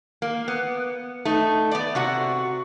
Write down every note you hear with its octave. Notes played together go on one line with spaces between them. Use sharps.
A#3
B3
A3 D#4
B3 D5
C3 F#4 F#5